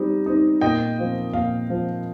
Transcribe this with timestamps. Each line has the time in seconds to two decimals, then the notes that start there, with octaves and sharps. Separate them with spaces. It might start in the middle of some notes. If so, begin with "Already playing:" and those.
Already playing: G3 C4 D#4
0.26 C4 D#4
0.61 A#2 D#5 G5
0.98 F3 C4 F4
1.33 A#2 F5
1.70 F3 C4 F4